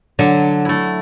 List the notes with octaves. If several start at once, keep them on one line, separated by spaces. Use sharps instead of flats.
D3 F#3
A3 E4